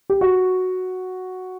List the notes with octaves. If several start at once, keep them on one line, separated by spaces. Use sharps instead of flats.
G4
F#4